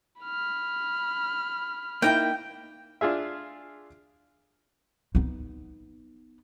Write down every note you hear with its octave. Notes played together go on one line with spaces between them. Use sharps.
B5 F6
A#3 D#4 E4 G5
D4 F4 G#4 E5
B3 D#4